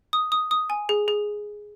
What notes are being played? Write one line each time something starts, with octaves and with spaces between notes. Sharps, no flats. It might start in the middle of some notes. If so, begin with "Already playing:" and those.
D#6
D#6
D#6
G#5
G#4
G#4